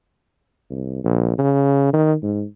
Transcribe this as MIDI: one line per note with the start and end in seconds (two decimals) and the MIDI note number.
0.70 1.03 36
1.04 1.33 34
1.38 1.88 49
1.93 2.14 51
2.22 2.44 44